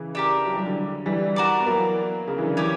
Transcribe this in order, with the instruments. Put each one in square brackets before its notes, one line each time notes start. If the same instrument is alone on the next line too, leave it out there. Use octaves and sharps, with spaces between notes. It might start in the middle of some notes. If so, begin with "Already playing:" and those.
Already playing: [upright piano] C#3 E3
[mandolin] D4 G4 A#4
[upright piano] F#3
G3
D3 F#3
E3 G3
[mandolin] F#4 A#4 D5
[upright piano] B3
F#3 A#3
C#3
E3
D3
[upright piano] C#3 E3 [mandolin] C#4 G4 C#5